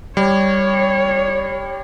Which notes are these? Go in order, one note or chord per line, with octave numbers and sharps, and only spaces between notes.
G3 C#5